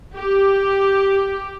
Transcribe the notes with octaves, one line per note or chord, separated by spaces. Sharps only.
G4